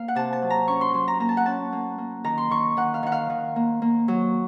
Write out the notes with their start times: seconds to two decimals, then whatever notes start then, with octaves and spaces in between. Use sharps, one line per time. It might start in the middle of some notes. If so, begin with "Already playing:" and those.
Already playing: A#3 F5
0.08 F#5
0.15 C3 A5
0.33 A5
0.42 F#3
0.50 A#5
0.68 C#4 C#6
0.81 C6
0.94 F#3 C6
1.08 A#5
1.20 A#3 A#5
1.29 A5
1.37 F#5
1.46 C#4 A5
1.72 A#3
1.98 A#3
2.24 D#3 A#5
2.38 C6
2.51 D#3 C#6
2.77 D#3 F#5
2.94 F5
3.03 D#3 F#5
3.12 F5
3.30 D#3
3.56 A#3
3.82 A#3
4.08 F#3